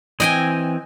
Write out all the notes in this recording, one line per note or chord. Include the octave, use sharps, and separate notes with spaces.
E3 C4 D#5 G5 G#5